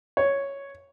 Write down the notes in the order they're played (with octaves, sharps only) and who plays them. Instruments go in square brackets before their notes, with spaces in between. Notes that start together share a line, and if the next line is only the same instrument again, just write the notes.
[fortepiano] C#5